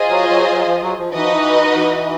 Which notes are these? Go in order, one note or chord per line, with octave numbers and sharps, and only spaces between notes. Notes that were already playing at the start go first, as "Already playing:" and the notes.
Already playing: F4 G#4 C5 D#5
F#3
F#3
F#3
F3
F#3
F3
E3 D#4 F#4 B4 D#5
F3
E3
E3